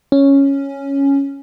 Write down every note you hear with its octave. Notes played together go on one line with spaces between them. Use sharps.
C#4